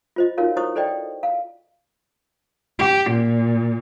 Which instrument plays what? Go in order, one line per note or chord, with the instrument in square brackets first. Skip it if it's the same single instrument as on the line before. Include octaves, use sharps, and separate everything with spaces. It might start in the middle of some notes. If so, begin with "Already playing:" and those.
[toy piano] F4 C5 D#5
D#4 F4 F#4 A#4 C#5 F5
E4 C5 C#5 C#6 D#6
A4 C5 D5 D#5 G5
F5
[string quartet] G4
A#2